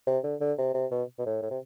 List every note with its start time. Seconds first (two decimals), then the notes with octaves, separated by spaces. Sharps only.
0.07 C3
0.24 D3
0.41 D3
0.58 C3
0.74 C3
0.91 B2
1.19 B2
1.26 A2
1.42 A2
1.51 C3